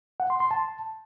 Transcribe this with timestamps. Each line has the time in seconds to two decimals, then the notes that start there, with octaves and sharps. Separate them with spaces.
0.20 F#5
0.30 C6
0.40 C6
0.51 A5